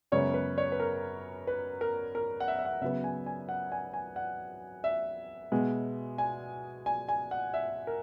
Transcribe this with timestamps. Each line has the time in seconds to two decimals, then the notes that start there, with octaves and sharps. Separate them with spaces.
0.12 F#2 C#3 G#3 B3 C#5
0.34 B4
0.58 C#5
0.72 B4
0.80 A#4
1.47 B4
1.81 A#4
2.15 A#4
2.40 F#5
2.48 E5
2.59 E5
2.65 F#5
2.82 C#3 F#3 B3 E5
3.04 G#5
3.26 G#5
3.49 F#5
3.72 G#5
3.94 G#5
4.16 F#5
4.84 E5
5.52 B2 G#3 B3
6.18 G#5
6.86 G#5
7.09 G#5
7.31 F#5
7.54 E5
7.87 A#4